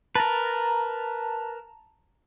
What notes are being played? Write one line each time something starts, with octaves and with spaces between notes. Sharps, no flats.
A#4 B4 A5 A#5